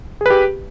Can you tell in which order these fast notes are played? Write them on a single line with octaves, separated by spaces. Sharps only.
G#4 B4 G4